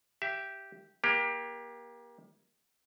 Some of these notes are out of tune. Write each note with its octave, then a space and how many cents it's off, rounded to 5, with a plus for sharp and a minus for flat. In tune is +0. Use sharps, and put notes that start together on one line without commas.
G4 -5 E5 +25
A#3 +30 G4 +20